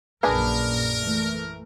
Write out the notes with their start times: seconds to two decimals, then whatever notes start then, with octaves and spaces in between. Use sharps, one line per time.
0.23 A#1 F#2 A#3 D4 G#4 A#4 B4
1.00 E3 A3